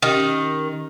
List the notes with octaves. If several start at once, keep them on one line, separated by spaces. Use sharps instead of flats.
D#3 C#4 G4 F6